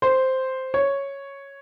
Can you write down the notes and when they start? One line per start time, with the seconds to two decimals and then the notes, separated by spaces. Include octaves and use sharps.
0.02 C5
0.74 C#5